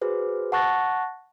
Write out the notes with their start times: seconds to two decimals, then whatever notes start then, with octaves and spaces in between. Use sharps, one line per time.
0.01 F#4 G#4 B4 C5
0.52 F#5 A5 C#6 F#6 A6 A#6